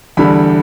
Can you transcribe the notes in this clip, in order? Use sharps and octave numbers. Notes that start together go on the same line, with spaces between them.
E2 D3 G3 B5